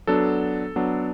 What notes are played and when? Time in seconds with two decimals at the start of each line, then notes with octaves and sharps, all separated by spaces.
0.07 F#3 B3 D4 A4
0.76 F#3 B3 D4